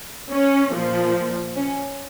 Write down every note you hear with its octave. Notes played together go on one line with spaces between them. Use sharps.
C#4
A#2 F3
C#4